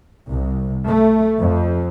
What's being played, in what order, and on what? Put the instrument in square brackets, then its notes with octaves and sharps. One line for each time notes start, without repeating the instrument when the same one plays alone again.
[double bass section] C2
A3
F2